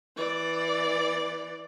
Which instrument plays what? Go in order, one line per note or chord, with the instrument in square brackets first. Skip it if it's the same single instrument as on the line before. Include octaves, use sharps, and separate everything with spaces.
[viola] E3 D5